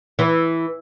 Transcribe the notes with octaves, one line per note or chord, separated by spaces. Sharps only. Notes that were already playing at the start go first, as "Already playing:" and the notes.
E3